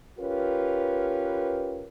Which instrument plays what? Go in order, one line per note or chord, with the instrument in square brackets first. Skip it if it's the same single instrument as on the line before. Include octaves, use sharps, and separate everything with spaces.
[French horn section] C#4 F4 G4 A#4 B4